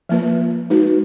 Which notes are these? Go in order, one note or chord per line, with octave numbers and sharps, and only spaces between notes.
F3 A#3 F4 B4
G#3 D#4 F#4 B4